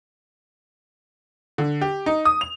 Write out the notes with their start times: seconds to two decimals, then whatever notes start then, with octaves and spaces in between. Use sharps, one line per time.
1.58 D3
1.81 G4
2.06 D#4
2.25 D#6
2.41 F7